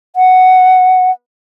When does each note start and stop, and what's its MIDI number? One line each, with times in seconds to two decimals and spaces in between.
0.16 1.11 78